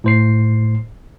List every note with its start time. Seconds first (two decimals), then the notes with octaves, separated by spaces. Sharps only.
0.04 A2 C5 C7